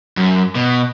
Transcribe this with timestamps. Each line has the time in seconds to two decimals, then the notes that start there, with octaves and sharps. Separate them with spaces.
0.17 F#2
0.55 B2